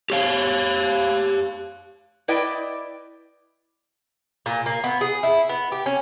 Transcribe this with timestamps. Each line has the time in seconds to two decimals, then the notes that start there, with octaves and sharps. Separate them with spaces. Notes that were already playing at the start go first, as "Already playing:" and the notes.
0.10 G4 C#5 F5
2.28 E4 B4 D5 D#5 G5
4.46 A#2
4.66 A#3
4.84 B3
5.01 G#4
5.23 E4
5.49 B3
5.72 G4
5.86 C#4